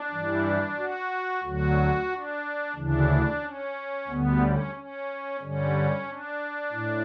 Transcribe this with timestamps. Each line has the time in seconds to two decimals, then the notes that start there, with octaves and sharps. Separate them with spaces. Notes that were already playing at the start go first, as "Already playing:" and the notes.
Already playing: D4
0.11 G2 E3 G3
0.78 F#4
1.44 D2 D3 F#3 F#4
2.09 D4
2.76 D2 C#3 E3 D4
3.42 C#4
4.08 D2 D3 G3 B3
4.42 C#4
4.75 C#4
5.41 G2 D3 G3 C#4
6.06 D4
6.72 A2